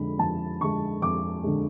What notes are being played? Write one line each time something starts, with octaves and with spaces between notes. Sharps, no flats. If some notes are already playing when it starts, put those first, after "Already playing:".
Already playing: F2 D3 G#3 B5
F2 A5
D3 G#3 C#6
F2 D6
D3 G#3